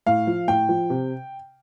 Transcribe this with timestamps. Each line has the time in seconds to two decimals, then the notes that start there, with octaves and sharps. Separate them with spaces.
0.06 A2 F5
0.27 F3
0.48 A2 G5
0.69 F3
0.90 C3